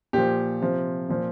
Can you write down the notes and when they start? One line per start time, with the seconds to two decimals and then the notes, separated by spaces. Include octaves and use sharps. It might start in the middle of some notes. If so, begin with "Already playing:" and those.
0.13 A#2 F3 G4
0.62 C3 F3
1.09 A#2 F3